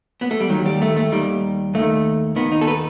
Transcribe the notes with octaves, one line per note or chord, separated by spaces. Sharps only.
B3
A3
G3
D#2 D#3 F#3
G3
A3
A3
D#2 D#3 G3
D#2 D#3 A3
D#2 D#3 B3
D#4
A4
B4